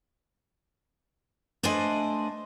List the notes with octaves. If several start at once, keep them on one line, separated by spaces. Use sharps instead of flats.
A3 D4 B4 C5 D#5 G#5